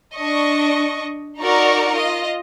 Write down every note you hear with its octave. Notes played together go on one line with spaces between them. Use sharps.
D4 D#5 C#6
D#4 F#4 A#4 D5 A#5 C#6
F4 D#5